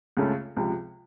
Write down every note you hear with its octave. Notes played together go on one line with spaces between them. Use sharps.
C#2 C#3 A3 C#4 F4
C#2 C3 F3